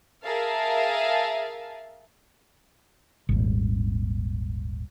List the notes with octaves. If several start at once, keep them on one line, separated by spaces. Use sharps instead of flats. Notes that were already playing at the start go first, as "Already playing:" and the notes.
G#4 A#4 E5 F5 A5
D#1 G#1